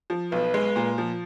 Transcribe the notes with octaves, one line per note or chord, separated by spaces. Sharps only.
F3
B1 B4
G#3
A#2
F3